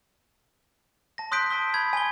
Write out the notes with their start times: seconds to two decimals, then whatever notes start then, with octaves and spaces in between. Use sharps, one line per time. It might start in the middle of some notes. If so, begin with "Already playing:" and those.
1.18 A5 A#6
1.31 C6 D#6 F#6 G6 B6 D7
1.50 A5 E6 G7
1.74 B5 E6 G#6
1.93 G#5 G7